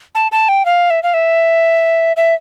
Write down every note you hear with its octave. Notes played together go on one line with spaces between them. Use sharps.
A5
A5
G5
F5
E5
F5
E5
E5